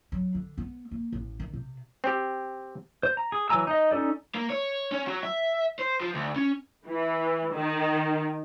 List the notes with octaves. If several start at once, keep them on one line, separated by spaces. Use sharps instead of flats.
F#3
D3
B3
A#3
A1
D#3
C3
C4 G4
C5
A#5
G#4
E3 F#3 G#5 A#5 E6
D#4 D#5
C#4 D#4 G#4 A4 D5
A#3
C#5
C#4
F#3
E5
C5
F3
D2
C#4
E3
D#3